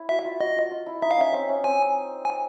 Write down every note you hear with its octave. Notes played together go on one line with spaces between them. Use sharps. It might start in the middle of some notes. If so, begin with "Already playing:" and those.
Already playing: E4
F#4 E5
F4
F#4 D#5
F4
F4
E4
D#4 E5
F5
C#4 E5
C4
C#4
C4 G#5
G#5